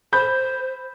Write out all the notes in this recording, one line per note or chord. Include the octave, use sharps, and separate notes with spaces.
C5 B5 G6